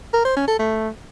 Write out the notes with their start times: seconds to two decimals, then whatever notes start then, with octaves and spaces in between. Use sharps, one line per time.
0.14 A#4
0.25 C5
0.36 C#4
0.48 A4
0.59 A3